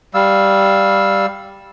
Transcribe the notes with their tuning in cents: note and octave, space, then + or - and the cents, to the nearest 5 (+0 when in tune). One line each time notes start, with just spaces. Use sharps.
G3 +0 F5 +0 E6 -5